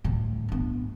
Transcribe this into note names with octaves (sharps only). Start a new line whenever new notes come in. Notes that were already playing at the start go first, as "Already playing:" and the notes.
D2 A2
G2 B3